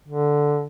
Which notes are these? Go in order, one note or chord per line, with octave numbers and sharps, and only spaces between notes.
D3